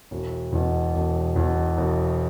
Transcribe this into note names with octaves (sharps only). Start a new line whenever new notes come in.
E1
E2 B2
E1
E2 B2
E1